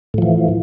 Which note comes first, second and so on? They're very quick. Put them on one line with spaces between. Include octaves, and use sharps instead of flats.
A2 F3 E3